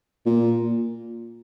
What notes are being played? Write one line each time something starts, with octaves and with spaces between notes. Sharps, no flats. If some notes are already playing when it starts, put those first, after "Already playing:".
A#2